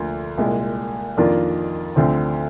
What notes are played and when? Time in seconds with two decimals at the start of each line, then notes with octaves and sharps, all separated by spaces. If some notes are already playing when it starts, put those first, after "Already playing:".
Already playing: D2 D3 F3 A#3
0.37 C2 A#2 G#3
1.17 F2 D#3 A#3 D4 F4
1.96 D2 D3 F3 C4